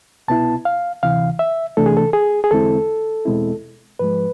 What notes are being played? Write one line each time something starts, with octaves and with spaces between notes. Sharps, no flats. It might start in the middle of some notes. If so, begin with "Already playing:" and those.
C2 B2 B3 E4 A5
F5
D2 C3 E3 F5
E5
C3 E3 A3 D4 A4
G#4
A4
G#4
G#4
E2 D3 G#3 C4 E4 A4
E2 B2 G#3 C4 E4
G#2 F3 G#3 B4